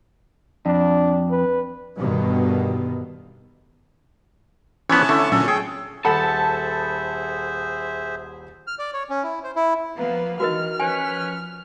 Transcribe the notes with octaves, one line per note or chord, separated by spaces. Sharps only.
F2 D4
B4
G2 B2 D3 D#3 B3
E3 F3 B3 C#4 E4 C#5 A5
D3 A3
A#2 F#3 C#4 A4
G#4 G5
D#1 G#4 A4 C5 E5 F#5 A5 B5
F6
D5
C#5
C#4
E4
C5
E4
F3 A#3 B3 B4 F5
D#3 E3 F#4 A#4 D#5 F6
F3 C#4 B4 G#5